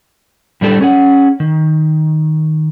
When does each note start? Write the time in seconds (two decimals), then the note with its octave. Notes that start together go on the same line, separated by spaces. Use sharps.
0.61 A2 G3 A3 D4 G4 A4
0.81 C#4 G#4 F#5
1.40 D#3